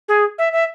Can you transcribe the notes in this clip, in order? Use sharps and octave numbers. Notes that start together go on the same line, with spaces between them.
G#4
E5
E5